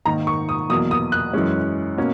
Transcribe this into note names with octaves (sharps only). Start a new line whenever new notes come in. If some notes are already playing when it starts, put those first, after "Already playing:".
G#2 D#3 A#3 D#4 A#5
C#6
D#6
E2 B2 F#3 A#3 D#6
D#6
F#6
F#2 E3 G#3 C#4
B2 A#3 C#4